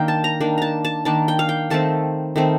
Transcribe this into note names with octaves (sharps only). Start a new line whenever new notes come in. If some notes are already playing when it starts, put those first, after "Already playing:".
Already playing: D#3 A#3 D4 F5 G5
A5
A#5
D#3 A#3 D4
A5 A#5
A5
D#3 A#3 D4 A5
G5
F5
G5
D#3 A3 C4 A5
D#3 A3 C4